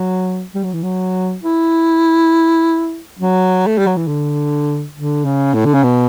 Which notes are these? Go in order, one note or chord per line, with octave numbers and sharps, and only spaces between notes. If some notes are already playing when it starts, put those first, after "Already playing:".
Already playing: F#3
G3
F#3
E3
F#3
E4
F#3
A3
G3
F#3
E3
D3
D3
C#3
A2
D3
C#3
B2